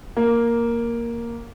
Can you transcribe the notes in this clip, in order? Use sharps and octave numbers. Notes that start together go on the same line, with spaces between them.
A#3